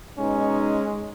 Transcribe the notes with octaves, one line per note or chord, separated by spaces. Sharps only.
B2 G#3 C#4 D#4